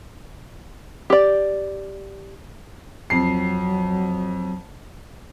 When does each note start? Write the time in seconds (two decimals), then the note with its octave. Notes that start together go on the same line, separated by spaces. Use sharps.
1.10 G4 D5
3.10 F2 F#3 C7